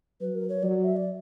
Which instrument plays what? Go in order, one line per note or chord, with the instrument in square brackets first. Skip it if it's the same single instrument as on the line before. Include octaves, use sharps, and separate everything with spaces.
[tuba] F#3 [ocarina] B4
[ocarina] A#4
C#5
[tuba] F#3 [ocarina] D5
[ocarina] E5
D5